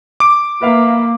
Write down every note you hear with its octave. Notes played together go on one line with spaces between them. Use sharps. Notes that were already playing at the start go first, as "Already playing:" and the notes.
D6 D7
A#3 B4 E5 F5